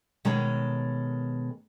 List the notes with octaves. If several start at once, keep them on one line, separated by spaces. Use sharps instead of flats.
B2 D#3 G#3 A4 C#5 A#5